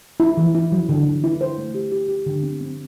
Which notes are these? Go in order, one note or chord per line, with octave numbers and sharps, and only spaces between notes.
E4
E3
E4
F#3
D3
D3
E4
C5
A3
G4
G4
G4
D3
C4
C4